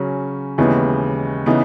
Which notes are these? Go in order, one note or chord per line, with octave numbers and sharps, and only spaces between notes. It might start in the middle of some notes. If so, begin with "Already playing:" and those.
Already playing: C#3 F#3 C#4
D#2 C#3 E3 G#3 B3
C#3 E3 B3 D#4